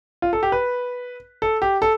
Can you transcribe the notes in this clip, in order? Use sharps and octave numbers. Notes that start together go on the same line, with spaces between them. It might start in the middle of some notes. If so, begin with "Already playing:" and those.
F4
A4
G4
B4
A4
G4
A4